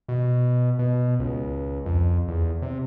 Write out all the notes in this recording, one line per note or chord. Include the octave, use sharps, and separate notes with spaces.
B2
B2
C#2
F2
E2
C3